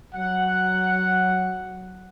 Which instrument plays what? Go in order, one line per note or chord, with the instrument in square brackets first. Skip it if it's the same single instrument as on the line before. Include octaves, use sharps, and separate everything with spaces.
[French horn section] F#3 [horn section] F#5